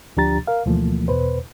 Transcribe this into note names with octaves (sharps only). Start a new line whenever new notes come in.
D2 F3 D4 G4 A#5 A6
A#4 F5
D2 B2 E3 F3 A3 A#3
E2 B2 B4 C5